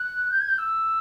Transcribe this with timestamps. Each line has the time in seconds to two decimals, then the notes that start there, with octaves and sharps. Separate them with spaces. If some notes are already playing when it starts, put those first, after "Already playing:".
Already playing: F#6
0.30 G6
0.40 G#6
0.48 G6
0.58 E6